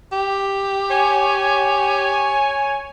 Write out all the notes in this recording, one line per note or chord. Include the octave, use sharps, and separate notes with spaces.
G4
C#5 G#5